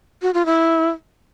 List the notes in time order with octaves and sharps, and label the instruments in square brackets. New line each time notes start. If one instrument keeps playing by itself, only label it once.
[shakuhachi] F#4
F4
E4